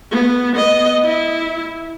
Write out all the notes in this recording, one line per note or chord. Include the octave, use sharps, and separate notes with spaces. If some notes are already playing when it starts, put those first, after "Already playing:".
B3
B3 D#5
E4